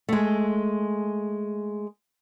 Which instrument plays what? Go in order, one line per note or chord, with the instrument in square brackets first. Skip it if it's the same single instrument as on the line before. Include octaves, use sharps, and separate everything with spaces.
[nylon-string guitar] G#3 A3